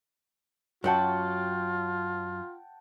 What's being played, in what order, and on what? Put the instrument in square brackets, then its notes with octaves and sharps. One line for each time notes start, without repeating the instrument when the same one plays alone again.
[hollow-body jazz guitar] F#2 F#3 F#4 [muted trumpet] F4 [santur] F#5 G5 A5